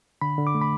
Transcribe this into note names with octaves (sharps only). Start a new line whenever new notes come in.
D3 B5
D3
D6
A3
B5